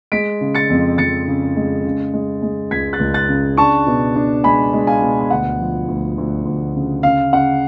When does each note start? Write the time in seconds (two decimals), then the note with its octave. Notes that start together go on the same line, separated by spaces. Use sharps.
0.12 G#3 B6 D7
0.41 C#3
0.55 A6 C#7
0.70 F2
0.98 F2 A6 C#7
1.28 C#3
1.56 G#3
1.85 C#3
2.14 G#3
2.42 G#3
2.71 C#2 G#6 B6
2.93 F#6 A6
3.00 C#2
3.14 F#6 A6
3.29 C#3
3.57 D4 A5 C#6
3.86 B2
4.16 D4
4.44 G#3 G#5 B5
4.73 G#3
4.87 F5 G#5
5.02 B2
5.21 G#5
5.31 D2 F#5
5.59 F3
5.88 D2
6.18 D2
6.46 D2
6.75 C#3
7.03 C#3 F5
7.32 C#3 F#5